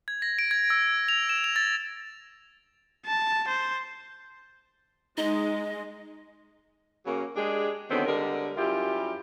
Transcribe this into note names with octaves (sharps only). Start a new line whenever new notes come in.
G#6
A#6
D7
G#6
E6
F7
E7
F7
A6
A5
C5
G#3 D#4 D#5
C#3 F#3 A#3
G#3 D4 G4 G#4
D3 D#3 F#3 B3 C4
D3 G3 G#3 A#4
F#2 G3 E4 F4 G4